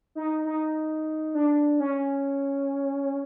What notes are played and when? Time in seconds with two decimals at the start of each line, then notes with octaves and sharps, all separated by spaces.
0.15 D#4
0.45 D#4
1.35 D4
1.80 C#4